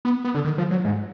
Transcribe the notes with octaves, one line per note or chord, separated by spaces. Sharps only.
B3
B3
D3
D#3
F3
F#3
G#2